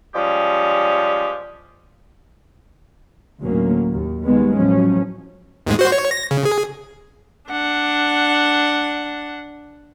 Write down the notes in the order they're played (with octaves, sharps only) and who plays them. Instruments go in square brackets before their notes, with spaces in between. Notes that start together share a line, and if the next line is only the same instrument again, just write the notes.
[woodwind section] F3 G3 G#3 C#4 G4
[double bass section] D2 A2 F#3 A#3 C#4
D#2
D#3 G3 G#3 B3
A1 F3 F#3 C#4
[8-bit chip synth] D#2 G#2 G#3
F#4 C5
C#5
A#6
C#3
G#4
[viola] D4 F#5